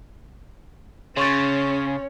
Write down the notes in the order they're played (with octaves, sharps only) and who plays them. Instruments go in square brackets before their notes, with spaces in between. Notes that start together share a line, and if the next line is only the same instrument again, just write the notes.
[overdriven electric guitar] C#3 [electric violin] C#4 [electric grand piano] C#5 G6 [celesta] C6 C#6 A6